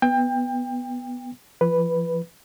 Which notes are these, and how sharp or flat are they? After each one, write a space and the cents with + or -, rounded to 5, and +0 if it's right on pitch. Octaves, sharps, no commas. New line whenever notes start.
B3 +0 G5 +25
F3 -35 B4 +0